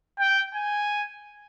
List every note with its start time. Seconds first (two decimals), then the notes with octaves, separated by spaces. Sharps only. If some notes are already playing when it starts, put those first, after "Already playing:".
0.20 G5
0.55 G#5